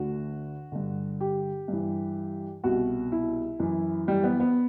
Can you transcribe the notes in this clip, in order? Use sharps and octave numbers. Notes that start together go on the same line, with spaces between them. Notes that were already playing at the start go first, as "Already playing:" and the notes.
Already playing: D2 D3 F#4
G2 D3
G4
G2 E3
C2 B2 F#4
E4
F#2 E3
G3
B3
B3